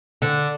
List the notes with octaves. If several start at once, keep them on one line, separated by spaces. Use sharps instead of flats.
D3